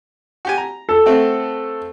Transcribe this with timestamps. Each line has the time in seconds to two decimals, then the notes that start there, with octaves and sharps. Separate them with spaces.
0.45 F#4 G4 G#5
0.58 A#5
0.89 A4
1.06 A3 C4 F#4